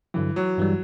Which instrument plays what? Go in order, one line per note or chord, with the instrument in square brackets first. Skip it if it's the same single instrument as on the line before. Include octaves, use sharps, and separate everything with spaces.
[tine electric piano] G2 D3 F#3 [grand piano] E3
[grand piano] F#3
[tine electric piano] G2 E3 G3